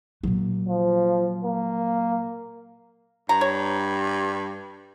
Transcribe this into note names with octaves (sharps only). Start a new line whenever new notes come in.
A#2 F#3
F3
A#3
G2 A#5
C#5